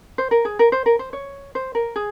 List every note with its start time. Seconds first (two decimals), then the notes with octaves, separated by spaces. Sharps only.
0.18 C5
0.31 A#4
0.45 G#4
0.59 A#4
0.72 C5
0.86 A#4
0.99 C5
1.13 C#5
1.55 C5
1.75 A#4
1.96 G#4